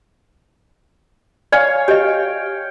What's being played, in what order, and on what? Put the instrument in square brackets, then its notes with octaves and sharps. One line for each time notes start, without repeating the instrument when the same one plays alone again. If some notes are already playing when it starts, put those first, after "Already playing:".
[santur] C#5 F5 G#5 [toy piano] D5
[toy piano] G4 D#5 [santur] G5